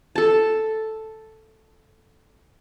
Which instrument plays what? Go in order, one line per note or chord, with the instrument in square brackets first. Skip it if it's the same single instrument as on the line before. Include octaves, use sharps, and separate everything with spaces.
[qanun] A4 A5